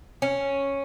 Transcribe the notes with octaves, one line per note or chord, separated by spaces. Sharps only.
C#4